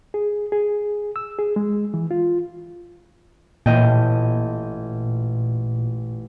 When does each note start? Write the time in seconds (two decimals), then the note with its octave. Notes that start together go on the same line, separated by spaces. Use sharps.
0.14 G#4
0.52 G#4
1.16 E6
1.39 G#4
1.56 G#3
1.94 E3
2.11 F4
3.66 A1 A#2 D#5 G5